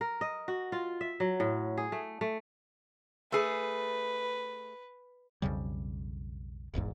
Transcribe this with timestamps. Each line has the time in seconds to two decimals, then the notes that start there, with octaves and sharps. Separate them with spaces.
0.01 A#4
0.21 D#5
0.48 F#4
0.72 F4
1.01 E5
1.20 F#3
1.40 A2
1.77 G#4
1.92 A3
2.21 A3
3.32 A3 G#4 B4
5.42 B1 F2 C#3 G3
6.74 D#1 G#1 E2 G#2